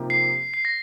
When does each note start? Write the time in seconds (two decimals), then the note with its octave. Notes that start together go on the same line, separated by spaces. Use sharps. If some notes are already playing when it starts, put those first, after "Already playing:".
Already playing: C3 F3 A#3 D#4 G4
0.10 C7
0.54 C7
0.65 A#6